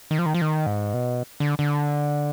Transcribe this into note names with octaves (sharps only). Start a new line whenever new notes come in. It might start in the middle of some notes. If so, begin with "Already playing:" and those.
D#3
F3
D#3
F3
D#3
G#2
B2
D3
D3